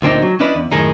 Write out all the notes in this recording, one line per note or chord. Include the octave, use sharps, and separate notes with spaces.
D2 A#2 C4 D4 D#4
F#3
C#4 D4 E4 B4 D5 D#5
E2
F#2 A2 D#3 G#3 D#4